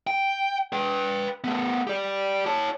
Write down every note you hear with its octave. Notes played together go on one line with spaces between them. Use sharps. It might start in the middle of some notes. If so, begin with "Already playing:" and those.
G5
B4 G5
A3 B3
G4 D5
C#5 A5